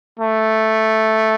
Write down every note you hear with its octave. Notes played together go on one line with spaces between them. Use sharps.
A3